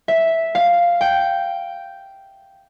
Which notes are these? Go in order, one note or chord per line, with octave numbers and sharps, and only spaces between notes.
E5
F5
G5